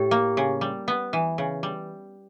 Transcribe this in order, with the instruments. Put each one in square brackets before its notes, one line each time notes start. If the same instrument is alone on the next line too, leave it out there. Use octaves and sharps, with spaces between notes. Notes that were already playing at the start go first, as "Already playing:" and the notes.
Already playing: [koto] A2 [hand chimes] G4
[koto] A#3
C#3
G3
B3
E3
C#3
G3